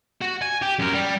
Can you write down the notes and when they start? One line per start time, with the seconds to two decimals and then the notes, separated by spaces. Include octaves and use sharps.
0.22 F#4
0.42 G#5
0.62 G4
0.79 F#2 A#4
0.94 G3